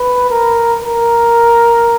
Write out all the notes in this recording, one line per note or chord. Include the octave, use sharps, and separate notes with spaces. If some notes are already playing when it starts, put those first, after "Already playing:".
Already playing: B4
A#4
A#4